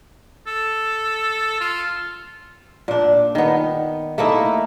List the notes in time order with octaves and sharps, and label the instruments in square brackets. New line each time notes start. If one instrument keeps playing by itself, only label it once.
[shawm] A4
F4
[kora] A#2 D4
D#3 B3
A3 A#3 D#4 E4